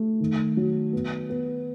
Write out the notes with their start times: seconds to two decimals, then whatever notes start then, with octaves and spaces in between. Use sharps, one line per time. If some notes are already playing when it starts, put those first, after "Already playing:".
Already playing: A3
0.20 D#3
0.57 F#3
0.93 B3
1.30 B3